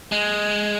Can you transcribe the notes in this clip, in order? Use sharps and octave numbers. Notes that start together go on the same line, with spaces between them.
G#3